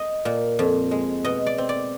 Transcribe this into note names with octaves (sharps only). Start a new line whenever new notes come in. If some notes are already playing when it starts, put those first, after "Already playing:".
Already playing: D#5
A#2
F2
G#3
B2 D#5
D5
C4
D5